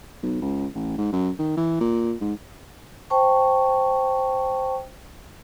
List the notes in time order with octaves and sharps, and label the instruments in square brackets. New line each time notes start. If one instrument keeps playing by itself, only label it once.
[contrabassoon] B1
C#2
A1
G#2
F#2
D#3
E3
A#2
G#2
[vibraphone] C5 G5 A5 C#6